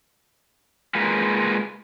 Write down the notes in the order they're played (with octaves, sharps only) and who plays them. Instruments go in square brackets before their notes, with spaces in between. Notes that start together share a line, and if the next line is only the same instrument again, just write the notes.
[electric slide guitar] G#3 A#3 F4 B4